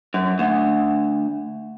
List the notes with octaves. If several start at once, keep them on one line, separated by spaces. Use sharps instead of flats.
F#2
D2